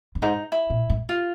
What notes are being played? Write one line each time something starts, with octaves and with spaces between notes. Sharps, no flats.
G2
G#2 D#4
E4
A#2
A2
F4